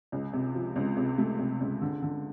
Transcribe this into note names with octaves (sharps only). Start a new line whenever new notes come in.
C#2
C3
F3
C#2
C3
A3
C3
C#2
D3
D3